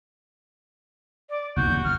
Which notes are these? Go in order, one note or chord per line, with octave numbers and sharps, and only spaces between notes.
D5
F#1 B1 F2 F#4 G6
D#2 A2 C3
F#1 F2 F6